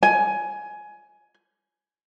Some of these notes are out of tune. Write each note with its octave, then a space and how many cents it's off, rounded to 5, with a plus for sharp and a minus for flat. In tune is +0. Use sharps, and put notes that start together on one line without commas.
G#5 +15